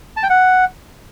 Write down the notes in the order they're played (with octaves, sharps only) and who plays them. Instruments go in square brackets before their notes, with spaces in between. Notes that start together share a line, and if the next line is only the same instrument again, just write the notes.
[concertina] A5
G5
F#5